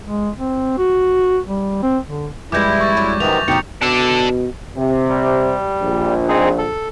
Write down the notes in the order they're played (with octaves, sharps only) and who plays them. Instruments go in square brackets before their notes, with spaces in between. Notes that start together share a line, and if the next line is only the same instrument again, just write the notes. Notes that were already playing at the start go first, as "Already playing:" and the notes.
[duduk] G#3
C4
F#4
G3
C4
D3
[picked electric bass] F2 G#3 [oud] E3 G3 [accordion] E4 [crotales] D6 G6 A#6
[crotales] C#6 A6
[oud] F#3 G3 D4
[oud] F#2 E3 [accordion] C3 D#3 B3 [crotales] F7
[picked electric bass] F#1 D2 B2 [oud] E3 F3 [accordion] D#4 G4 [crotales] C#7
[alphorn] B2 [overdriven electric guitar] D4 A4
[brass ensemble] C3
[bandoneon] G3
[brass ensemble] A#1
[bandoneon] C4 D#4 G#4
A4